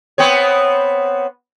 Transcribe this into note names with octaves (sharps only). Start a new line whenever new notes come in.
B3 C4 C#5